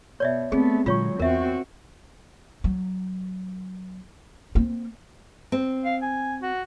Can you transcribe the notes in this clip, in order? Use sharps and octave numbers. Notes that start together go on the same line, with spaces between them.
B2 C#5 D5 E5
A3 B3 C4 G#4
A#2 D3 F#3 G#3 F4 C#5 C#6
E2 C4 F#4 A#4 E5
F#3
A#3 C4
C4
F5
G#5
F#4